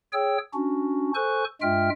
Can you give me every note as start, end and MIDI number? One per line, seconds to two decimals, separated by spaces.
0.13 0.38 68
0.13 0.38 73
0.13 0.38 79
0.13 0.38 88
0.54 1.11 61
0.54 1.11 62
0.54 1.11 66
1.15 1.44 69
1.15 1.44 72
1.15 1.44 80
1.15 1.44 85
1.15 1.44 90
1.62 1.90 43
1.62 1.90 56
1.62 1.90 65
1.62 1.90 76
1.62 1.90 79
1.62 1.90 89